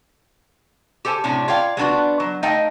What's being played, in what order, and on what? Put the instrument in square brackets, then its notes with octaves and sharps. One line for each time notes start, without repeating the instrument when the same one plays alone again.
[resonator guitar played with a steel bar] G4 A4 C5 G#5
A2 C3 C#4 D4
F4 C#5 D5 F5 G5
G#3 A3 B3 D4 F4 F#4
F#3
A3 D#4 D#5 F5 G5